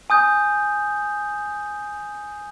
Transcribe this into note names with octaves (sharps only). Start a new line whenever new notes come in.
G#5 D#6 G6